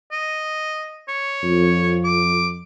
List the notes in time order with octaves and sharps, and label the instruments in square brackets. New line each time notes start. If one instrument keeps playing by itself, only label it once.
[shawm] D#5
C#5
[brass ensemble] F2
[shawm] D6